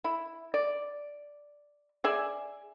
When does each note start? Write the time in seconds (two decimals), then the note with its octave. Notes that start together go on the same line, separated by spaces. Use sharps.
0.04 E4
0.54 D5
2.04 G#4 D5 E5 G#5